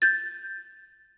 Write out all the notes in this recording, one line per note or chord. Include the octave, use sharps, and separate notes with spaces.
G6 A6